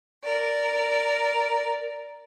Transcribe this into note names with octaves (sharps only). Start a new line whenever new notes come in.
A#4 D5